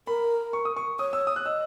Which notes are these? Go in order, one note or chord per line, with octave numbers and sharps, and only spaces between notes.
A#4 B5
C#6
D#6
C#6
C#5 D#6
E6
D#6
F#6
D#5 E6